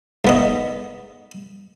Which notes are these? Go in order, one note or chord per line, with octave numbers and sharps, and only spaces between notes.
G#2 B3 D#5